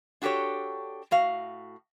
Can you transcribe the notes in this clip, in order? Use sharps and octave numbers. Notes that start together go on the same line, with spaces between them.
D4 F#4 G4 A4 C#5
A2 F#4 F5